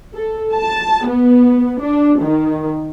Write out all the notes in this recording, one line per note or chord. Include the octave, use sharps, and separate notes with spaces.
A4
A5
B3
D4
D#3